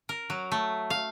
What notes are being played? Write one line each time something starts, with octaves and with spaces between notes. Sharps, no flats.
A#4
F#3
A3
F5